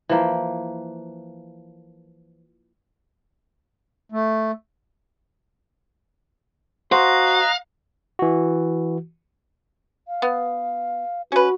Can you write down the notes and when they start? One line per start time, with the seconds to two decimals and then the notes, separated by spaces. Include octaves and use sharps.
0.09 E3 F3 A#3
4.12 A3
6.92 F#4 C5 D#5 F5 A#5 F#6
8.19 E3 F#4
10.07 F5
10.22 B3
11.32 C#4 F#4 B4